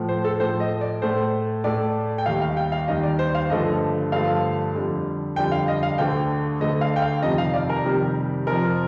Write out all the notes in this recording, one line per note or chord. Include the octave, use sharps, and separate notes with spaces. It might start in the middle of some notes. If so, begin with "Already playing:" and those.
Already playing: A2 F3 A3
C5
A4
A2 F3 A3 C5
D#5
D5
A2 A3 C5
A2 A3 D5
G5
D#2 D#3 G3 F5
F5
G5
F5
D#2 D#3 G3 D#5
D5
C5
F5
G2 D3 F3 A3 D#5
G2 D3 F3 A3 F5
F2 D3 G3
F2 D3 G3 G5
F5
D#5
F5
D2 D3 A3 G5
D2 D3 A3 D#5
F5
G5
F5
F2 C3 D#3 G3 D#5
F5
D5
A#4
F2 C3 D#3 G3
F2 C3 F3 A#4